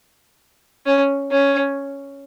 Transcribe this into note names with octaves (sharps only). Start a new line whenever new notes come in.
C#4
C#4